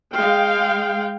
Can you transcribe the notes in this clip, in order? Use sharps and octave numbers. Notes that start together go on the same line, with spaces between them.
G#3 F5 G5